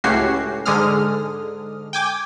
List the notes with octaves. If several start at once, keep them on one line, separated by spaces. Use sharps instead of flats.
C#2 A2 C#4 F#4 G4 C7
G#2 D3 G#3 D#6 F6
G5 G#5 D6